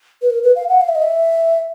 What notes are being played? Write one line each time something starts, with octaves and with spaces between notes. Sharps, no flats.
B4
A#4
B4
F5
F#5
F5
E5
D#5
E5